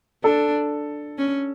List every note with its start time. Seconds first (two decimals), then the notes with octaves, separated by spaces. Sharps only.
0.23 D4 A4
1.18 C#4